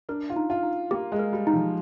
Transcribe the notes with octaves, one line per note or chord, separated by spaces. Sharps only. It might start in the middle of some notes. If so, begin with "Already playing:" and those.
D4 A#4
F4
D#4
F4
D#4
A#3 G4
G#3
A#4
G3
D#4
F3